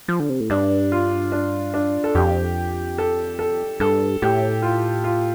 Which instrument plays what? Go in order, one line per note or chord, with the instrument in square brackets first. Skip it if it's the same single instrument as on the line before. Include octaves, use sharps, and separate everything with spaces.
[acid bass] F3
D3
C3
A2
[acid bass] G2 [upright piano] D4
[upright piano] F4
D4
D4
A4
[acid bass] F2 [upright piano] G4
[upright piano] A4
A4
[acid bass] G2 [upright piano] A4
[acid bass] A2 [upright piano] G4
[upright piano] F4
F4